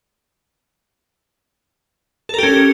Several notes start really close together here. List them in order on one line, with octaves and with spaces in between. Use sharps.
A4 A#4 G4 C#4